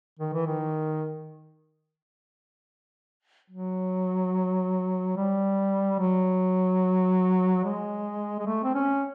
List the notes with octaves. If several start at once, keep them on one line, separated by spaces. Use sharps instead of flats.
D#3
E3
D#3
F#3
G3
F#3
G#3
G#3
A3
C4
C#4